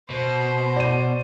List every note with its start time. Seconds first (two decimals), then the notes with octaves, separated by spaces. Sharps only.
0.10 B2 C5
0.76 D5 D#7